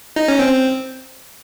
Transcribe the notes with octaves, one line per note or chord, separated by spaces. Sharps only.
D#4
C#4
C4